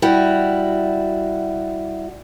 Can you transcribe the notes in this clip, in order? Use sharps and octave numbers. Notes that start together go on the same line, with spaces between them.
G3 E4 F#4